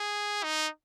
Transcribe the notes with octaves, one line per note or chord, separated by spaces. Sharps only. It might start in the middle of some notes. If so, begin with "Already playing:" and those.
Already playing: G#4
D#4